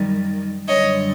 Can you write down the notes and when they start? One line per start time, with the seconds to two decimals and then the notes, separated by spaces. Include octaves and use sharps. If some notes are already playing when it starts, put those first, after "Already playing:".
Already playing: F#2 D#3 G3
0.68 F#2 D3 G3 C#5 D#5